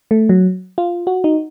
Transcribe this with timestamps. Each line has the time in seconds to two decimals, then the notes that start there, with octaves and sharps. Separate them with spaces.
0.11 A3
0.29 F#3
0.78 F4
1.07 F#4
1.24 D#4